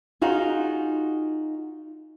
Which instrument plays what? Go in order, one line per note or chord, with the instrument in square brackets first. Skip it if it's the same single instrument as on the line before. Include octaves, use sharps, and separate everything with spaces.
[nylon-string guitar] D#4 F4 F#4 G#4